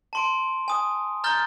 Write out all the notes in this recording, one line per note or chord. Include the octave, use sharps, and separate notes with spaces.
A5 C6 D7
G#5 D#6
A#5 F6 G6 A6 G7